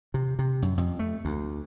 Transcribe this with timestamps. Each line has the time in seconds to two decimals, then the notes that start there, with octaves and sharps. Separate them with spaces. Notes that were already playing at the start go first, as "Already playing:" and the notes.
0.14 C3
0.39 C3
0.62 F#2
0.78 F2
0.99 A3
1.25 D2